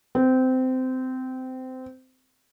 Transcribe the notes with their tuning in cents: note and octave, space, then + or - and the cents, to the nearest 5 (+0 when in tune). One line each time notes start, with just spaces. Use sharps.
C4 -20